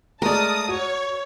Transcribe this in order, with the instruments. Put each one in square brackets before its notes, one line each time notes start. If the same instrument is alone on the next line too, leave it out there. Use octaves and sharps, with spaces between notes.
[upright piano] G#3 A3 [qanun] A#4 D5 [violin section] A5 D#6
[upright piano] F#4 [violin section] C#5